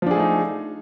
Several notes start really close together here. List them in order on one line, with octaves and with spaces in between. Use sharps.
F3 D4 G#4 A3 D#4